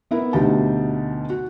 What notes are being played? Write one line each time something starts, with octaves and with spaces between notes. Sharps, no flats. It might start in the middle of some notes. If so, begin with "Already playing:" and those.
B3 E4 A#4
D2 B2 D#4 G4 A5
F#4